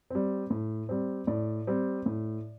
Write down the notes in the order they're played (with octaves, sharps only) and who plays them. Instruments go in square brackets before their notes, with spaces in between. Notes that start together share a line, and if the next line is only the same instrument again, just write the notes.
[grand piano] G3 C4
A2
G3 C4
A2 D5
G3 C4
A2